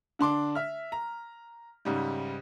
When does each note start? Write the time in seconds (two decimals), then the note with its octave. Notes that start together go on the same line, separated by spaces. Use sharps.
0.19 D3 D4 C6 D6
0.55 E5 F6
0.92 A#5
1.85 G#2 C#3 G3